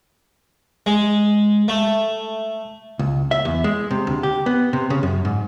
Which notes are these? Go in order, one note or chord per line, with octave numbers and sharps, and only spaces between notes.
G#3
A3
C#2
E5
E2
G#3
C3
D2
G4
B3
C3
C#3
F#2
G#2